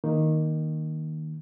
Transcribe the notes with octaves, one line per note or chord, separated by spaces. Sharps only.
D#3 A#3